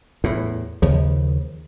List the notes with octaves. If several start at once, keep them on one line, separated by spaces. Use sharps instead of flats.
E2 A2
D#2 C#3 F3